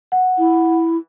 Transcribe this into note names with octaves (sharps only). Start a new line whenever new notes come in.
F#5
E4